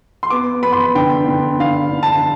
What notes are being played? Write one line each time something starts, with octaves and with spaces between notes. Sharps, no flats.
C6
B3 D6
B3 B5
C6
B5
D3 G5
D3
D3 F5
D3
A5